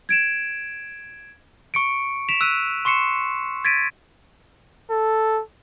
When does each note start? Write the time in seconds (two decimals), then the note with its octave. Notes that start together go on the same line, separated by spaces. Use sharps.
0.09 G#6 D7 E7
1.74 C#6 C#7 D7
2.29 B6 D7 E7 F7
2.41 E6 F#6 B6 D#7
2.85 C6 C#6 C7 C#7 E7
3.65 G#6 A6 B6 D7 D#7
4.90 A4